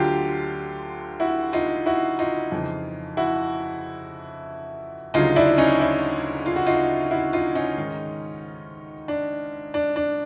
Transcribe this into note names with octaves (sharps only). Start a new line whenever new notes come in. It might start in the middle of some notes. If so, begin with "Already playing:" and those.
Already playing: D2 D3 F#3 F4 G4
E4 F#4
D#4 F4
E4 F#4
D#4 F4
F2 C#3 E3
E4 F#4
D2 C#3 F#3 D#4 F4
D4 E4
C#4 D#4
D4 E4
F4
F#4
D#4 F4
E4 F#4
D#4 F4
C#4 D#4
G#2 D#3 G#3
D4
D4
D4